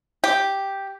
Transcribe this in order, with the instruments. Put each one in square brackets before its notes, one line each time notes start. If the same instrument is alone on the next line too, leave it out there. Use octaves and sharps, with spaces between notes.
[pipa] G4